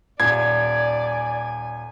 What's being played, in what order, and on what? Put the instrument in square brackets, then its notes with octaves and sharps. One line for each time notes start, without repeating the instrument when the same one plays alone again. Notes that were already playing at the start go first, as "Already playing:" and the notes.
[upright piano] D#1 [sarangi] D5 [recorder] G#5 [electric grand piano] G#6